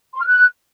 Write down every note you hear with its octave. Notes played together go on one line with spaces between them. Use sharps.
C6
F6
F#6